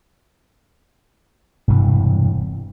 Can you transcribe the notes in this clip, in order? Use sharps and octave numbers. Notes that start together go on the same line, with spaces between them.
E1 G2 C3 E3